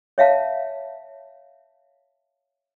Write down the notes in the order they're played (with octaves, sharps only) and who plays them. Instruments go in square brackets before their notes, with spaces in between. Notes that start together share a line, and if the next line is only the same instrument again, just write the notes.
[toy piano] C#5 E5 F5 A5